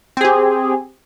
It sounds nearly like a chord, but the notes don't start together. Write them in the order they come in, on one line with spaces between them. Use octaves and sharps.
C4 G#4 G4